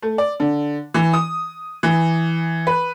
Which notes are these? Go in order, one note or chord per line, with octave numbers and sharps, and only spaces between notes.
A3
D5
D3
E3
D#6
E3
B4